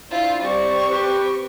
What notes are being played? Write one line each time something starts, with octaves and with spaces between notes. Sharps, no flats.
D4 E4 F4 C5
G3 C4 D5 C#6
G4 B4